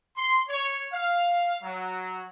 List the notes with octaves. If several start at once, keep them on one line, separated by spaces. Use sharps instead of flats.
C6
C#5
F5
F#3